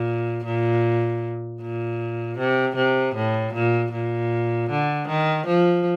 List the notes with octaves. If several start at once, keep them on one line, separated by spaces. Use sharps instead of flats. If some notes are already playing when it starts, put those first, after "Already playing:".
Already playing: A#2
A#2
A#2
C3
C3
A2
A#2
A#2
D3
D#3
F3